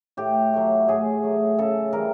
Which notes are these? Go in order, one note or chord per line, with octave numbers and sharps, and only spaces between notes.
A2 G4
F#3 A3
A2 G#4
F#3 A3
C#3 A4
E3 G3 A#4